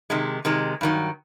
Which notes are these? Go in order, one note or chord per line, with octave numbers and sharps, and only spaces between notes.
C3 D#3 G#3
C3 D#3 G#3
G2 D#3 F#3